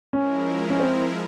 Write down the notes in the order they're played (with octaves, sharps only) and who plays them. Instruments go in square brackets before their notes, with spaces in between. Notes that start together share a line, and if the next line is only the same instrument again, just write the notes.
[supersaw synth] F3 G#3 E4 A#4 [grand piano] C#4
[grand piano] C#4
C4